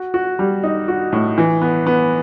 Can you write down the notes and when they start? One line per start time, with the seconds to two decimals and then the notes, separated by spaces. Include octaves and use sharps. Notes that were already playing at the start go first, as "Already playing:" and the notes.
Already playing: F#4
0.14 F#4
0.39 G3
0.63 D#4
0.88 F#4
1.13 A2
1.38 E3
1.62 B3
1.87 B3